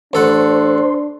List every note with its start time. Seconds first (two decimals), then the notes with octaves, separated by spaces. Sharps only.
0.13 A1 D4 A4 C5 F#5